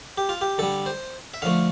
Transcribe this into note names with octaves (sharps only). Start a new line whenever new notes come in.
G4
F4
G4
D3 G3 A4
C5
E5
D3 F3 A3 F5